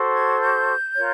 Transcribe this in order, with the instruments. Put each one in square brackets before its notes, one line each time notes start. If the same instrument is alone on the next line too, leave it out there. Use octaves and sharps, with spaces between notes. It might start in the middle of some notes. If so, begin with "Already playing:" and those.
Already playing: [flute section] F#4 A4 C5
G#6
G6
F4 A#4 C#5